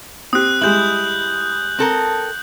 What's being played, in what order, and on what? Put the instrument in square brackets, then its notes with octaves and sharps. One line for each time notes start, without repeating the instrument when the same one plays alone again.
[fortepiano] C4 G4 [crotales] D#6 F#6
[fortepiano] G3 G#3 [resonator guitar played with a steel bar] E4 [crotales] G6 F#7
[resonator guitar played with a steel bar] C4 A4 A#4